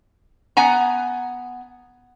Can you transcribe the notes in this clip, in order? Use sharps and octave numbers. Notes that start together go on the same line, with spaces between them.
B3 F#5 G#5 A#5